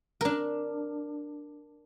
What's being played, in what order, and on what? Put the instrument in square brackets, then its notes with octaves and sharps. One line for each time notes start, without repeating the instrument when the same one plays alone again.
[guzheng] D4 A#4